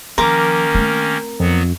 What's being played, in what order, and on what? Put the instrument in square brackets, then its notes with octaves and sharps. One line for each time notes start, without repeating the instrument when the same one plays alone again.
[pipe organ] D#3 A#3 C#4 [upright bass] F3 [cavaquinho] A#4 D6
[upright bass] A3 C4
[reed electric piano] F2 [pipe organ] F#3 B3